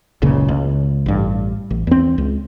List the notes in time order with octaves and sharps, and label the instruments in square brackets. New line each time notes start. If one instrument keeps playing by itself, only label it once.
[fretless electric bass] F#1 C#2 A#2 C#3
C#2
A1 G2
A1
E2 C4
C#2